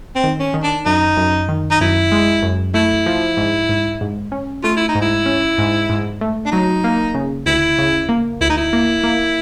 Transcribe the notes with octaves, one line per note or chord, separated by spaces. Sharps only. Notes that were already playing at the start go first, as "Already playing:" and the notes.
C4
D#3
C#4
D#3
D4
F#2 D#4
F#2
D#3
D#4
F#2 E4
G#3
F#2
A3 E4
F3
G#2
G#2
G#2
C#4
A3 F4
E4
D#4
G#2
E4
C#4
G#2
G#2
A3
D4
F#3 D#4
A#3
C#3
D2 E4
C#3
A#3
D2 E4
D#4
E4
A#3
A#3